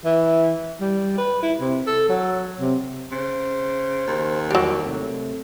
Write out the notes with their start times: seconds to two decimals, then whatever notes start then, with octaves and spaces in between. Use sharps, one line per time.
0.05 E3
0.81 G3
1.18 B4
1.43 E4
1.61 C3
1.87 A4
2.09 F#3
2.60 C3
3.11 C#3 C5
4.07 D#2
4.51 E2 E3 F#3 G3 D6
4.83 C3 A3